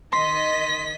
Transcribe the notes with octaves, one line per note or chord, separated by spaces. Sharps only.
D#3 D#5 C6 B6